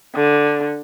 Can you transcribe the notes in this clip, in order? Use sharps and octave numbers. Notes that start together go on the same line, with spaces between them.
D3